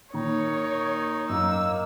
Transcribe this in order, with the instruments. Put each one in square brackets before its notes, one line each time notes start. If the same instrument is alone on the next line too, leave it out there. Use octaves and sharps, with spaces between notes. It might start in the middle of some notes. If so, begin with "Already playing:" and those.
[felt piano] A#2 D#3 A#5 [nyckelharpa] D#4 A#4 [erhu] C#5
[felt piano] F#2 [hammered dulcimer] D#3 A#3 [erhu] E6